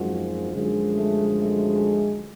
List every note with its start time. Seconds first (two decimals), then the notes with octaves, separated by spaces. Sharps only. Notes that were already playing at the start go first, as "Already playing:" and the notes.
Already playing: G#1 F#2 F3 G#3 F#4
0.53 F#2 D3 F3 G#3
0.95 A3
1.38 A3